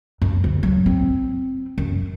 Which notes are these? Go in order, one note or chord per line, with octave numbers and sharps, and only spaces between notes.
F#2
D2
F#3
C4
F#2